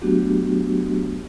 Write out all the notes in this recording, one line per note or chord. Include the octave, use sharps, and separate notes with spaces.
F#3 A3 B3 D4 F#4 G4